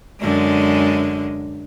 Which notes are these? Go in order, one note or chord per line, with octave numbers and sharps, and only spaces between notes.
F#2 D3 G#3